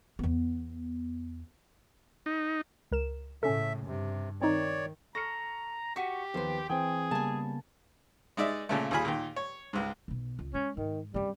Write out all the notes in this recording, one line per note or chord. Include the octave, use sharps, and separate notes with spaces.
E2 B3
D#4
C#2 A#4 E7
A2 C#3 C#4 A4 E5
G2 C3
D#3 C4 D#4 C#5 D5
A4 A#5 C#6 F6 A#6 C#7
F#4 G4 C#6 B6 D#7
D#2 F3 B3 C5 C6
E3 C4 G#4 G5
C#3 G3 A#3 B3 G#5 A5
G#3 D#4 D5 E5
A#2 C#3 A3
D#2 F4 G#4 G#5 B5
A#2 D#3
C#5
C#2 G#2
B1 B2
C#2
G#3 C#4
G#2 D#3
F#2 G3 C4